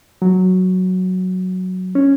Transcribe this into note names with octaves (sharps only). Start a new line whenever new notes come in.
F#3
C#4